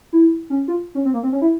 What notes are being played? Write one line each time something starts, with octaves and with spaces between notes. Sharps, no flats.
E4
C#4
F4
C#4
C4
A#3
C4
C#4
E4